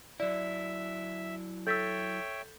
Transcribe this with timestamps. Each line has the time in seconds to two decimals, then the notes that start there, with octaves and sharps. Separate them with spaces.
0.20 F#3 E4 D5 E5
1.67 A4 C#5 E5 G5 E6 G6 A6 B6